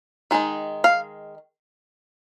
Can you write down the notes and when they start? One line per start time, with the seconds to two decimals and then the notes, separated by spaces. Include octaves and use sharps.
0.31 D#3 G#3 D#4
0.84 F5